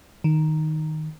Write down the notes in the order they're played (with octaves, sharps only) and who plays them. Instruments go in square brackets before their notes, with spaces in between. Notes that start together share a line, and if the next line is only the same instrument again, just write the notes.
[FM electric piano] D#3